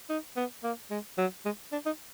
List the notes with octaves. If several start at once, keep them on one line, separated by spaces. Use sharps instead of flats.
D#4
B3
A#3
G#3
F#3
G#3
D4
D#4